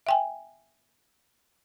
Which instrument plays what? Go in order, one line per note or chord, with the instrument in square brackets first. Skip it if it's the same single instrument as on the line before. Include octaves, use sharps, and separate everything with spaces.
[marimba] E5 G5 G#5